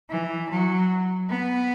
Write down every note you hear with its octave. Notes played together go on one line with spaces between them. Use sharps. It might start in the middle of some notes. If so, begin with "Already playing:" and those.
E3
F#3
B3